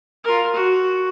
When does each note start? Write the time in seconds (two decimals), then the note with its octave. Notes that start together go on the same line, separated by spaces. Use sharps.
0.24 F4 A#4
0.54 F#4